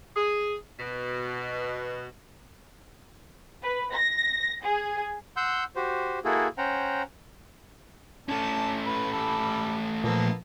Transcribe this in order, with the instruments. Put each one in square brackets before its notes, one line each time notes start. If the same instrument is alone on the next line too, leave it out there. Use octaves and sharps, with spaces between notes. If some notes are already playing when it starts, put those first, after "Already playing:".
[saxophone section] G#4
B2
[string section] B4
A#6
G#4
[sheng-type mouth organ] F#5 C6 E6 G6
F#4 G4 C5
A#3 E4 F#4 G#4 A4
C#4 C5 F#5 G5 A#5
[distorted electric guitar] A3 C#4 [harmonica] D4 A5
[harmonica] B4
G3 A4 B5
[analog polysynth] A#2 F3 [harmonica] A#3 B3 A4